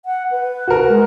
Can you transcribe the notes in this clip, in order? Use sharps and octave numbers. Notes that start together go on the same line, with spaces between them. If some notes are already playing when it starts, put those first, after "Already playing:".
F#5
B4
F#4 A#4
G#3